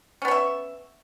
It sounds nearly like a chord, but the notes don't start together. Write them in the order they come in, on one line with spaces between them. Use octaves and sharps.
C#4 B3 C#5 E5